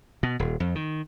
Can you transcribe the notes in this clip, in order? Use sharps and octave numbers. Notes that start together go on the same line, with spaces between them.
B2
D#1
F2
D#3